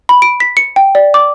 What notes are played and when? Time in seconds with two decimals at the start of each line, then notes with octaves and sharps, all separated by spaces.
0.09 B5
0.22 D7
0.40 B6
0.57 C#7
0.76 G5
0.95 D5
1.14 D6